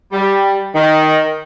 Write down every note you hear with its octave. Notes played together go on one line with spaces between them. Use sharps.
G3
D#3